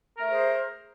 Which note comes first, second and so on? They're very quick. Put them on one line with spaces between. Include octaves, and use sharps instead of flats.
A#4 A3 G#4 C5